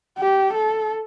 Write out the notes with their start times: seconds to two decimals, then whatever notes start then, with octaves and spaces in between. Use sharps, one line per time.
0.18 G4
0.53 A4